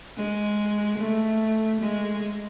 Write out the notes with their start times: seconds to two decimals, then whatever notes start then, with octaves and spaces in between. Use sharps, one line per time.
0.17 G#3
0.98 A3
1.81 G#3